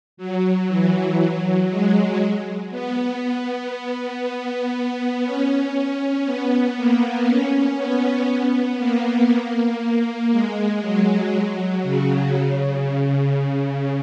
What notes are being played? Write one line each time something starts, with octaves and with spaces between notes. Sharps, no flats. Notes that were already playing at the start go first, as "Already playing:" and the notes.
F#3
E3
F#3
G#3
B3
B3
C#4
B3
A#3
C#4
B3
B3
A#3
G#3
F#3
F#3
C#3
C#3